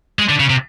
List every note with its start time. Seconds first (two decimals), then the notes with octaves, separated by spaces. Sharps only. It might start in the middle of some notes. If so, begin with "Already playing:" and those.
0.19 G#3
0.29 D3
0.40 C#3
0.50 C3